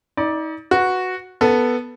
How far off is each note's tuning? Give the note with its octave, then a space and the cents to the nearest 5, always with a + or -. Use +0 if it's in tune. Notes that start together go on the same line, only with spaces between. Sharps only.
D#4 +35 D5 +0
F#4 -5 B4 +0
B3 -5 A4 +5